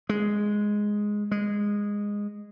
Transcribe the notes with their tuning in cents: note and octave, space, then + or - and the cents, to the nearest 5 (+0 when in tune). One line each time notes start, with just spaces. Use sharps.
G#3 +0
G#3 -15